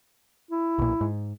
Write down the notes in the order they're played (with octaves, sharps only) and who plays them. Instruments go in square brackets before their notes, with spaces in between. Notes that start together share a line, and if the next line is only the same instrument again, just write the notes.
[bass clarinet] E4
[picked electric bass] B1 A#2
G#2